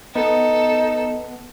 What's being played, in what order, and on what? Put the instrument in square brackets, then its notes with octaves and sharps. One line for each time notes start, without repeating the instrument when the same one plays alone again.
[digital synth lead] B3 [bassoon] D#4 [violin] A4